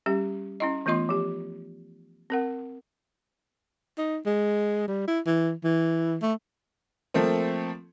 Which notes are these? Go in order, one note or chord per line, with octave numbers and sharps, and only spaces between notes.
G3 C#4 G4
C#4 E4 D#5
E3 A3 B3 F4 D#5 C6
F3 G4
C4 A#4 F#5
D#4
G#3
G3
E4
E3
E3
A3
F3 A3 A#3 C4